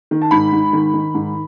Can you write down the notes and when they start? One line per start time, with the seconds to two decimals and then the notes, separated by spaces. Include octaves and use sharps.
0.11 D#3
0.22 A5
0.31 G#2 B5
0.52 G#2
0.73 D#3
0.94 D#3
1.14 G#2